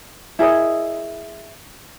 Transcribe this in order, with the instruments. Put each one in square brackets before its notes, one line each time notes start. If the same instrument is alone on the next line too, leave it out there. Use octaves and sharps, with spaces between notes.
[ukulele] E4 G#4 A#4 D#5